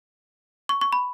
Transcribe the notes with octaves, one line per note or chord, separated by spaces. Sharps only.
C#6
C#6
B5